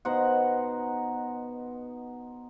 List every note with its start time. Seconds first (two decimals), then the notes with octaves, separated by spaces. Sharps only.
0.05 B2 D#4 C5 F#5